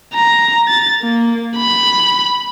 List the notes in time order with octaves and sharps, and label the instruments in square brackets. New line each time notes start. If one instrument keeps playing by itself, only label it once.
[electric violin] A#5
A6
A#3
B5